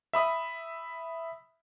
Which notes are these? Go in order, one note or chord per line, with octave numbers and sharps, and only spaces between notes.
E5 B5 D#6